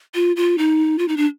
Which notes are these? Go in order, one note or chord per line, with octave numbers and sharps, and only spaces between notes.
F4
F4
D#4
F4
D#4
D4